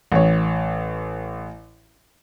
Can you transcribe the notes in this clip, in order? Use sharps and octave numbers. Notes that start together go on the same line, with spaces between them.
A1 C#5